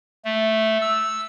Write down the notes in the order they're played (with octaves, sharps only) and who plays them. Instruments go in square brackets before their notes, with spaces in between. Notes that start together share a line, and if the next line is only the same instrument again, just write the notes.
[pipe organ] A3
E6